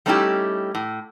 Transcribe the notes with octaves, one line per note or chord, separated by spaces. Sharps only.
G3 A3 C#4 D#4 E4 G4
A2